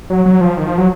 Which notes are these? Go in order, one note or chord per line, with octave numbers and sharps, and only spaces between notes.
F#3
F#3
F3
D#3
F3
F#3